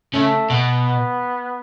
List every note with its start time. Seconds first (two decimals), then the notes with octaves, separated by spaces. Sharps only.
0.14 C#3 A3
0.50 B2 B3